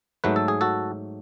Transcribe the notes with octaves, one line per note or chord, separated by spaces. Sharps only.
G#2 F#3 A3 B4
A4
G#4
F#4 A4